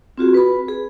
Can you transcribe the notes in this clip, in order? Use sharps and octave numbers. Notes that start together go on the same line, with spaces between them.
C4 F4 F#4 G#4
B4 B5
G#4